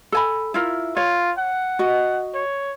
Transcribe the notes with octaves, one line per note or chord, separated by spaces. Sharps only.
A4 G#5 B5
E4 F4 A#4
F4 C#5
F#5
F#4 D#5
C#5